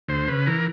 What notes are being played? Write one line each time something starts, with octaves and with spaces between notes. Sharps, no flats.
D2 C5
C#3 B4
E3 A#4